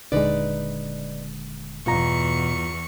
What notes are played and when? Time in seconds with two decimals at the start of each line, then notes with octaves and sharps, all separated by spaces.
0.12 D#1 D3 G#3 D#4 B4 D5
1.86 E2 G2 B2 F4 A#5 C#6